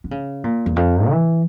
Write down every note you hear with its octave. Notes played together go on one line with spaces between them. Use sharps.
D3
C#3
A#2
E2
F2
E3